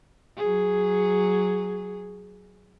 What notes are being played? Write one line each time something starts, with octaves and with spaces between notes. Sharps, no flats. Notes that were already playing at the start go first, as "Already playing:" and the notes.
F#3 G#4